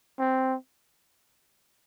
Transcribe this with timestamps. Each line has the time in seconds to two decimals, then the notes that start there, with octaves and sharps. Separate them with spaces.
0.19 C4